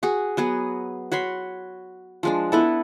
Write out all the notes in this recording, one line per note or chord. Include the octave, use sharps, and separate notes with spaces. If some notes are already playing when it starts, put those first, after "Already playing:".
F#4 G#4
F#3 B3 G#4
F#4 C#5 B5 C6
F3 G#3 D4
B3 E4 A4